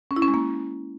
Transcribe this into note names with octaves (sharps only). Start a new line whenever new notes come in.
C#4
E4
C#4
G#3
A#3